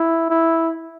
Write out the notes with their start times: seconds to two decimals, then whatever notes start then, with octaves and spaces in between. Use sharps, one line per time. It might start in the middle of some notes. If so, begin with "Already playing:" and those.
Already playing: E4
0.30 E4